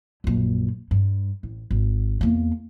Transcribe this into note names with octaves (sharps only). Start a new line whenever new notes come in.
A#1 F#2
G2
A1
G#1
E2 A#3